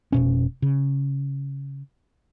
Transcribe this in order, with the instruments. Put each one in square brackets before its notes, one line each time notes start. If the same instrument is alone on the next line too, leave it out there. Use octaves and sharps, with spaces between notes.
[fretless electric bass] F1 B2 C#4
C#3